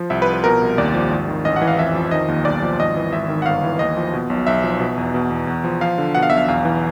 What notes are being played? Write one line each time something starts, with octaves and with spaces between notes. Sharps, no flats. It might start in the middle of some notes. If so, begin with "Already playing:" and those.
Already playing: F3
C2 E5
B4
F3
B4
B2 A#4
C2
D#2 D5
F3
G#1
D#3
A1 D#5
F#5
E3
F5
F2 E5
F3
D#3 D#5
D#2
B1 D5
F3
G#1 D#5
E3
G#1 E5
D#3
F#5
G1 F5
E3
D#2 D#5
F3
B2
B1
B1 E5
F3
B2
E2
B2
E2
E2
F3
F3 F5
D3
B2 F#5
F5
B1 E5
F5
E2 F5
E3